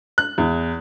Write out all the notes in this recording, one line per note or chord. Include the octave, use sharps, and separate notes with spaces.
F#6
E2